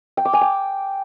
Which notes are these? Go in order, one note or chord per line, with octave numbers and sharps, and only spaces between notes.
G5
D6
G#5
G5